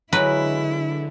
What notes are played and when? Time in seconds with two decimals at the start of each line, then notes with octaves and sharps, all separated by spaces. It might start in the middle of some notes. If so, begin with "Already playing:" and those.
0.13 D3 F#3 G#3 E4 B4